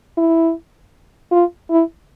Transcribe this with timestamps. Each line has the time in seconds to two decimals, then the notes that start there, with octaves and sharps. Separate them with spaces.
0.18 E4
1.32 F4
1.70 E4